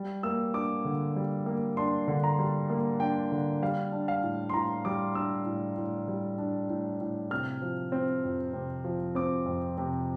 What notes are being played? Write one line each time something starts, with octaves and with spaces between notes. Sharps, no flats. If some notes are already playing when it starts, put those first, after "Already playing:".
Already playing: G3
A#3 E6
D4 D6
D3
G3
A#3
D4 C6
D3
A#5
G3
A#3
D4 G5
D3
G3 F5
D4
F5
A2
C6
A2 A#5
G3 D6
D4 E6
A2
A2
G3
D4
A2
A2
C3 F6
F3
C4
F2
C3
F3
C4 D6
F2
C3